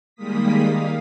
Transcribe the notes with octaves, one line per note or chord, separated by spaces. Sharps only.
D#3 G3 G#3 A#3 D#6 B6
F5